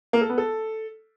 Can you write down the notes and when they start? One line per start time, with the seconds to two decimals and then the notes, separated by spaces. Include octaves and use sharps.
0.13 A#3
0.21 A4
0.30 B3
0.38 A4